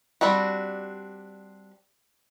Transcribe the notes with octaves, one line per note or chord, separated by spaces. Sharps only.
G3 C4 D4 F#4